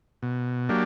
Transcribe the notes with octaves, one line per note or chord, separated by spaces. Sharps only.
B2
F#3 A#3 D4 G4